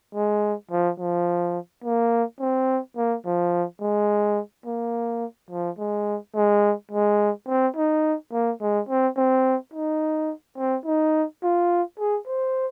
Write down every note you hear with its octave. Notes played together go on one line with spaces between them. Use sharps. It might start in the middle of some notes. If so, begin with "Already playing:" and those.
G#3
F3
F3
A#3
C4
A#3
F3
G#3
A#3
F3
G#3
G#3
G#3
C4
D#4
A#3
G#3
C4
C4
D#4
C4
D#4
F4
G#4
C5